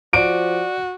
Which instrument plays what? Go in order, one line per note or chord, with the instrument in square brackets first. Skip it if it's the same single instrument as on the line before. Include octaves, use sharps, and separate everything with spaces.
[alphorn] F3 [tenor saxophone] F#4 [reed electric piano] D5 D6 [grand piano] D7